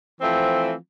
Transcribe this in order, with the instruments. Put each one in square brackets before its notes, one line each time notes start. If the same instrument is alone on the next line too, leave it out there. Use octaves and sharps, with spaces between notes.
[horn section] E3 F3 A3 C4